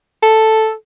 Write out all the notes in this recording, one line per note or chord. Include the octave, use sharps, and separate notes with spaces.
A4